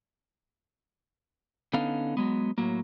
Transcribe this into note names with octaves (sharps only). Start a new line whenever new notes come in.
D3 B3 C#4 D#4 A4 F5
F#3 G#3 B3
A2 F#3 A#3